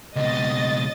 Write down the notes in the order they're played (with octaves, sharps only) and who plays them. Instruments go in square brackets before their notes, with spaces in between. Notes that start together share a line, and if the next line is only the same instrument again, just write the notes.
[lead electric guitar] C#2 B2 [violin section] D#5 A6